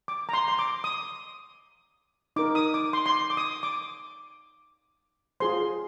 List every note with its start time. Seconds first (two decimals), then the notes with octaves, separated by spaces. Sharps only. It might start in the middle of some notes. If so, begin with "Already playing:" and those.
0.08 D6
0.29 A#5
0.33 C6
0.48 C6
0.59 D6
0.84 D#6
2.36 D#4 A#4 D6
2.55 D#6
2.74 D6
2.93 C6
3.06 C6
3.12 D6
3.30 D6
3.37 D#6
3.63 D6
5.40 F4 G#4 C5 C6